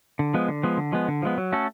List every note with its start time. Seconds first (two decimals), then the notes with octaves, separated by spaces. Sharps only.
0.19 D3
0.34 F3 G#3 B3
0.48 D3
0.63 F3 G#3 B3
0.77 D3
0.92 F3 G#3 B3
1.08 D3
1.22 F3 G#3 B3
1.38 F#3
1.52 A3 C#4 F#4 A4